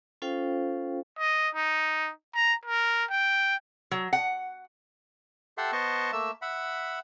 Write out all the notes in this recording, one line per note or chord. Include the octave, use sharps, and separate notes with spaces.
C#4 F4 A4 C5 F5 G5
D#5
D#4
A#5
A#4
G5
F#3
F#5
G4 A4 E5 F#5 C6
B3 C5 D#5 A5 C#6
A3 A#3 E5 E6
E5 F#5 B5